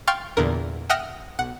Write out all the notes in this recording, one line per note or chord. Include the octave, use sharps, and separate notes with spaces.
F5 G5 C6 C#6 F6 A6
E2 A#2 D3 A#4
E5 F#5 G5 D#6 F6 A#6
B1 F#5